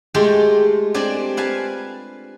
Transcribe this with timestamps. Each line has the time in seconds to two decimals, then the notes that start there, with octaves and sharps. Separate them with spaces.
0.14 G#3 A3 F4 G4 A4 G5
0.94 C4 D4 G4 D5 G#5
1.37 B4 F5 G#5 A5